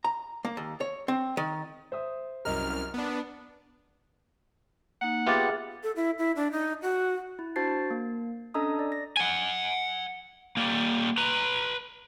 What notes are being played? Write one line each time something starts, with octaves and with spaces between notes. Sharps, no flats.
A#5
A#3
D#2
C#5
C4
D#3
C5 E5 D#6
C2 F#2 A#4 D#5 F6 F7
B3 D4
A#3 D#4 F#5
B3 F4 G4 G#4 E5 D6 A6
A4
E4
E4
D4
D#4
F#4
E4
D4 F#4 C5 A5 A6 C7
A#3
C#4 D4 A4 D#5 A#5 D#6
D5
A#6
F#5 G#5
G3 A#3
B4 A#5